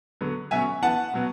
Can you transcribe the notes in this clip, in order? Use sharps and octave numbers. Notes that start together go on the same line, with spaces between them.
D3 F#3 B3
B2 F#3 C#4 E5 G#5
E3 B3 F#5 A5
B2 F#3 B3